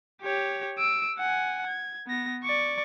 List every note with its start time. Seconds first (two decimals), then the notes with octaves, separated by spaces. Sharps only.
0.22 G4 C#5
0.78 E6 D7
1.18 F#5 G#5
1.67 G#6
2.07 B3 A#6
2.44 D5 C#6